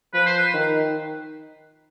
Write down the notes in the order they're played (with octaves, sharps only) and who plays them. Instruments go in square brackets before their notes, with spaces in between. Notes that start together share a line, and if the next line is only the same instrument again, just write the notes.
[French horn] F3 [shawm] B4
[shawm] C5
B4
[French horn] D#3